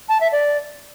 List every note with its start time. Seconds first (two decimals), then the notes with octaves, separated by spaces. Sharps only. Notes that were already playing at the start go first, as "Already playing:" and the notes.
0.09 A5
0.21 E5
0.32 D5